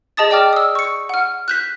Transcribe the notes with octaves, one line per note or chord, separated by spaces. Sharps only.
G#4 D#5 A5 D#6 A6
D5 D#5 G5 D6 F6
D#6 E6
C#6 C#7
F#5 F6
F#6 G6 B6